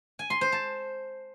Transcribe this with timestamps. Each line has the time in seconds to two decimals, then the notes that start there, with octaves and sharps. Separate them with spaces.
0.19 G#5
0.30 C6
0.41 C5
0.52 A5